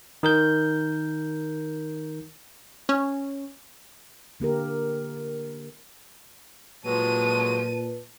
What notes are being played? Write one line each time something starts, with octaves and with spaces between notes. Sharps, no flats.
D#3 A#4 G6
C#4
D3 A#3 G4 A#4
A#2 F3 F#3 G#3 B4 A5 D#7